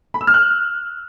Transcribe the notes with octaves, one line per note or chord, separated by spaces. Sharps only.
B5
E6
F6
F#6